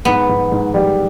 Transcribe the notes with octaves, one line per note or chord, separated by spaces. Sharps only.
G#2 B3
G#2
G#2
G3